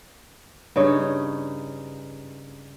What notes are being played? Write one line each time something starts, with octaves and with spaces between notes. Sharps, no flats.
G2 C#3 D#4 C#5